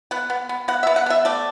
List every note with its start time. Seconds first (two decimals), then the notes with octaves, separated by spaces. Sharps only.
0.11 B3 F#5
0.30 B3
0.49 B3
0.68 B3 F#5
0.83 E5
0.87 B3
0.96 F#5
1.06 B3 E5
1.25 A3 D5